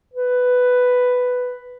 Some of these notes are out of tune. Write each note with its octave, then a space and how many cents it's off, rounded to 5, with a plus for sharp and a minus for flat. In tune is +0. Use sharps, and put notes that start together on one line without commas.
B4 +5